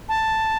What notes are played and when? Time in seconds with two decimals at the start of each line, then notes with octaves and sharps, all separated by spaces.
0.09 A5